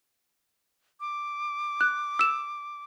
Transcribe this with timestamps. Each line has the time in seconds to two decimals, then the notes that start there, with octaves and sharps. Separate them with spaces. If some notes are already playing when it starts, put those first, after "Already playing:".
1.00 D6
1.81 F#6
2.19 E6 E7